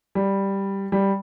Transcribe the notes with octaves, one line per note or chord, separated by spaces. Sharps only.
G3
G3